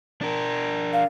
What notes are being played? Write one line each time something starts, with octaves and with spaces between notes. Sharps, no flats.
D4 A#4
F5